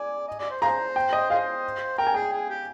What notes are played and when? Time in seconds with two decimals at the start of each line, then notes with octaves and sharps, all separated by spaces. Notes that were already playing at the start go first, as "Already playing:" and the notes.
Already playing: D5 G#5
0.28 D#5
0.39 D5
0.50 C5
0.62 F4 G#4 C5 A#5
0.96 G5
1.13 D#5
1.30 F4 G#4 C5 F5
1.98 A#4 G5
2.07 G#5
2.14 G#4 G5
2.33 G#4
2.50 G4